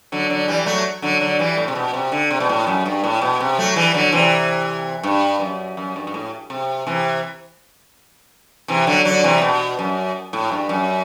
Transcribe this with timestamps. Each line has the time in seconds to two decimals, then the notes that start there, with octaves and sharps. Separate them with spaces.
0.12 D3 F#3
0.30 D3 F#3
0.48 E3 G3
0.66 F#3 A3
1.02 D3 F#3
1.20 D3 F#3
1.39 E3 G3
1.57 A2
1.68 C3
1.75 B2
1.94 C3
2.12 D3
2.30 C3
2.40 B2
2.49 A2
2.67 F#2
2.86 G2
3.04 A2
3.22 B2
3.40 C3
3.58 F#3 A3
3.76 E3 G3
3.94 D3 F#3
4.12 C3 E3
5.03 G2
5.40 F#2
5.77 F#2
5.96 G2
6.07 G2
6.14 A2
6.50 C3
6.87 C3 E3
8.68 C3 E3
8.87 D3 F#3
9.05 D3 F#3
9.23 C3 E3
9.41 B2
9.79 F#2
10.33 A2
10.51 G2
10.69 F#2